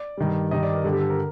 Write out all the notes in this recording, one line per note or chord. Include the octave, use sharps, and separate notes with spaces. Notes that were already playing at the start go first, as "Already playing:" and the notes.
Already playing: D5
G2 D#3 G3
G2 D#3 G3 D#5
D5
A#4
G2 D3 G3 A4
G4
A4
A#4